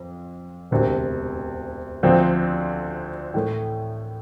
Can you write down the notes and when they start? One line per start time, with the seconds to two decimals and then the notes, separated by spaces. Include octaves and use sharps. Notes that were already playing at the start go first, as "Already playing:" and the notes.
Already playing: F2
0.71 E1 D2 C3
2.03 D2 D3 F3 C4
3.34 A2 E3 A3